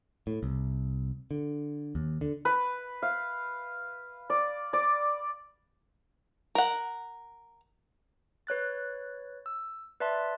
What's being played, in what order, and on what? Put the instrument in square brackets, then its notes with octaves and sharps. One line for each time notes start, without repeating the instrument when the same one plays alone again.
[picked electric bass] A2
C2
D3
D#2
D3
[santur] B4
F5
D5
D5
[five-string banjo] A#4 F#5
[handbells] B4 C#5 F#6 A6
E6
B4 D5 E5 A5 C6